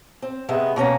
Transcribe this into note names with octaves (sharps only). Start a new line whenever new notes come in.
C4
C3 G#3 B3 E5
B2 A#3 C#4 A#5